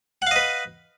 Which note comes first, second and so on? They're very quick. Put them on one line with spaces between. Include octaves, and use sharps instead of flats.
F#5 F5 D#5 B4